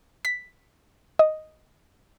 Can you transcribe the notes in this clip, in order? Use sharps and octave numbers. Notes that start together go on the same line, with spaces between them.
B6
D#5